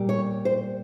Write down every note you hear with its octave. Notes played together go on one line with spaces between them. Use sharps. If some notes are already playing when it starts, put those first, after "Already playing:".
Already playing: A#2 G3
C#5
C5